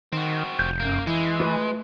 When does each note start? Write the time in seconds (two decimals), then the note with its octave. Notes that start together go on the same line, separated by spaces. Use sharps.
0.13 D#3 C4 F#4
0.59 F1 G6
0.80 F#2 A#3
1.07 E3 G#3 E4
1.40 A3 F4 B4